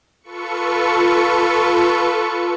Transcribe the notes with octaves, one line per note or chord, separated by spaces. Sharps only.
F4 A4 B4 C#6 C#7